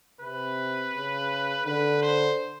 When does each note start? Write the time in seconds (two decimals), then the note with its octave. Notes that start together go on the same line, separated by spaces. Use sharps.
0.21 C3 B4
0.94 C#3
1.66 D3 B4
2.02 C5